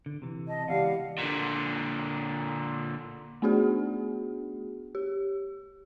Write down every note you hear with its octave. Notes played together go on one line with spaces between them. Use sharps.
D3
C3 E3
D#5 A5
C#2 E3 B3 G4 D5 F5 F#5
A#2 D3
A3 B3 D4 F#4 G#4
G4